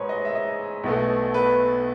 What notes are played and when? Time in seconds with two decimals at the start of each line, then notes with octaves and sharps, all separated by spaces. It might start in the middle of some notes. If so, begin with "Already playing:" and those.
Already playing: A1 G#2 B4 C#5
0.09 D#5
0.25 E5
0.35 D#5
0.84 B1 B2 A3
1.34 B4